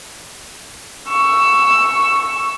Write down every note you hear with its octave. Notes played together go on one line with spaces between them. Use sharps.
C#6 E6